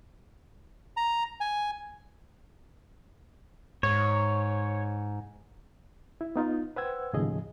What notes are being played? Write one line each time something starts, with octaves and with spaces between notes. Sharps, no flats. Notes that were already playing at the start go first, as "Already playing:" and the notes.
A#5
G#5
G#2 C#5
E4
B3 D#4 F4
B4 C5 F#5 G5 E6 G#6
D#2 A2 C#3 F3 G#4 D#5